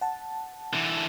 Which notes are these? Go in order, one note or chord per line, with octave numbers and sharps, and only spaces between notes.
F#5 A5
D3 E3